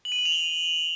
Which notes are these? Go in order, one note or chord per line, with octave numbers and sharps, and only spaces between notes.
F#7
D#7
F#7
F7
G7